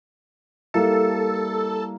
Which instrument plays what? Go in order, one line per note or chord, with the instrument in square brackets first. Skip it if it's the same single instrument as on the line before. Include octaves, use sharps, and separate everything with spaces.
[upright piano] G3 A#3 E4 [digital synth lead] A4